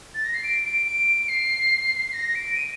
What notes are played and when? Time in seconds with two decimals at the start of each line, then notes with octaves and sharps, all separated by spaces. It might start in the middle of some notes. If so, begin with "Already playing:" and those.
0.14 A6
0.24 A#6
0.34 C7
0.44 D7
0.64 D7
0.86 D7
1.28 C7
2.13 A#6
2.35 D7
2.56 D#7